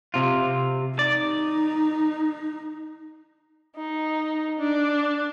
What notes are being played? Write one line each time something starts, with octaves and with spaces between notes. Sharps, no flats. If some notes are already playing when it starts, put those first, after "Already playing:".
C3 F4
D#4 D5
D#4
D4